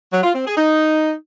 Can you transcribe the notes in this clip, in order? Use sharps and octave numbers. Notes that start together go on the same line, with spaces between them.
F#3
F4
C4
G#4
D#4